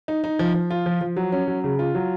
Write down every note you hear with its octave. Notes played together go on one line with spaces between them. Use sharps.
D#4
D#4
F3
F3
F4
F3
F3
F#3
C#4
F#3
C#3
F4
F#3